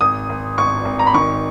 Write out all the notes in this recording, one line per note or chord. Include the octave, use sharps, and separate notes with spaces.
G#1 D#6
G#1
G#1 C#6
G#1
A#5
B5
D#3 C#6